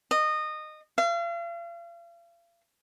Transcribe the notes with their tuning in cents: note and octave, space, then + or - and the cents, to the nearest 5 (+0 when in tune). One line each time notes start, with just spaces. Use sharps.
D#5 -20
F5 -40